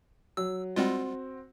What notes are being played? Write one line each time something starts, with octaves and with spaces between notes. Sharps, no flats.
F#3 E6
G3 G#3 C4 F4 F#4